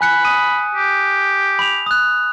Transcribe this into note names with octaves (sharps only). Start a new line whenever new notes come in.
G#5 B5 F#6 C#7
D#6 D#7
G4
B5 F7
D#6 F#6